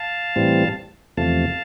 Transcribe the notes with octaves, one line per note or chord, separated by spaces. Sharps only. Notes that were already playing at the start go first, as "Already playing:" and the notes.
Already playing: F5 A5
A2 E3 G3 C4
E2 C3 F3 A3 F5 A5